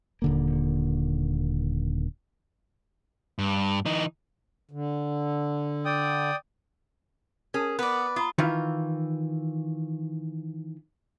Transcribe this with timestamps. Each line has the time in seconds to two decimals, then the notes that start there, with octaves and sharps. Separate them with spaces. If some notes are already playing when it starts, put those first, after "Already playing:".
0.22 D#1 D3 A#3
3.39 G2
3.86 E3 D#4
4.71 D3
5.85 D5 G5 D#6
7.54 C#4 G#4 A#4
7.79 B3 B4 D5
8.16 F4 A#5 B5 D#6
8.38 D#3 E3 F4